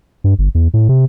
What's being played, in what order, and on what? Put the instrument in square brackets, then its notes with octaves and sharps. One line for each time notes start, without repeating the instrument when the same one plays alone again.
[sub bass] G2
G1
E2
A2
C3